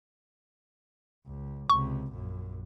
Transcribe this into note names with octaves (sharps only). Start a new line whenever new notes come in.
C#2
C#2 C3 C#6
A#1 F#2